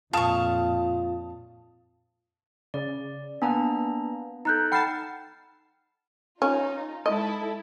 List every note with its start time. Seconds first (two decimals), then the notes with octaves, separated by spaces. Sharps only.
0.13 F2 A#2 F4 F5 A5 C#6 D#6 E7
2.74 C#3 D5
3.42 A#3 B3 D4 G#5 A#5
4.45 D#4 A4 A#5 F#6 G6
4.72 F#5 G5 A5 B5 F6 A6 C7
6.42 C#4 D#4 F4
7.06 G#3 E4 A4 D#5